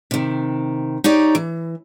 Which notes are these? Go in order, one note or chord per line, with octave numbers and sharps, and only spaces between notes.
C3 D#3
D#4 G4 C#5 D5
E3